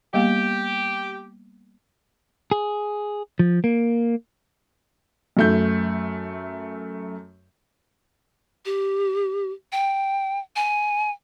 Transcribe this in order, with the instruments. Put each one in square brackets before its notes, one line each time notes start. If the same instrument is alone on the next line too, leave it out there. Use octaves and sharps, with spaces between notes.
[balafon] G3 A#3 B3 [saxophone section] G4
[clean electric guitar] G#4
F3
A#3
[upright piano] F#2 A3 G6
[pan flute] G4
G5
G#5